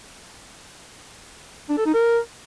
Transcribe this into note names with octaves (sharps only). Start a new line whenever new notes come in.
D4
A4
D#4
A#4